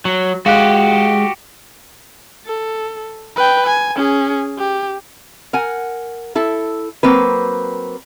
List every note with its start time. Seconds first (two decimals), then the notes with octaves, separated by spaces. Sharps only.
0.05 F#3
0.46 G#3 F#4 G4 F5 F#6
2.46 A4
3.36 B4 G5
3.66 G#5
3.96 C#4 G#4
4.58 G4
5.53 A#4 F#5 G#5
6.35 E4 A4
7.03 F#3 A#3 C4 B4